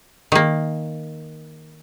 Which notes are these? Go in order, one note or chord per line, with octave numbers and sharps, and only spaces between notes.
D#3 A#3